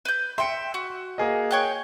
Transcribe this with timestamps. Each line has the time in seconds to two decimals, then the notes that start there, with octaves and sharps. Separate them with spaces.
0.05 B4 G6
0.38 E5 G5 C6 C#7
0.74 F#4
1.18 A#3 G#4 D#5
1.51 C#5 G5 F#6